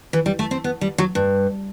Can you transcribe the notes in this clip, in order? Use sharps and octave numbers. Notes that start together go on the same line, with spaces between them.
E3
G3
A3
C4
B3
G3
F#3
G2